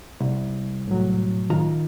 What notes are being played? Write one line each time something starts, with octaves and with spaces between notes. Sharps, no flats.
C2
A2 F#3
D#3 F4 A#5